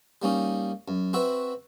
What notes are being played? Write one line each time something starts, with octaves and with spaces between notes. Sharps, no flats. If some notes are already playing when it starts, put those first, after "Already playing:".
G3 A#3 C#4 D#4
F#2
C4 F#4 B4 E5